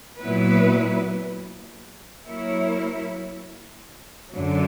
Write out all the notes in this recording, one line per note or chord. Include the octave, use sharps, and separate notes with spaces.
A#2 F#3 B3 E4 B4
F#3 A#3 E4 A#4 C#5
F#2 D3 F#3